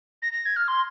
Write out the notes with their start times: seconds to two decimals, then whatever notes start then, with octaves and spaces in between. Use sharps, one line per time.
0.22 A#6
0.33 A#6
0.46 G#6
0.56 F6
0.68 C6